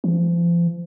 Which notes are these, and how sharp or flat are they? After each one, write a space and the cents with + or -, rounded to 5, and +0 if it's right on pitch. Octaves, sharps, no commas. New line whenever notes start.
F3 -35